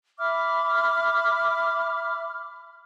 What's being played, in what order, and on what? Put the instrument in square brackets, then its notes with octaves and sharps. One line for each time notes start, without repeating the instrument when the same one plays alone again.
[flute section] E5 B5 D6 F6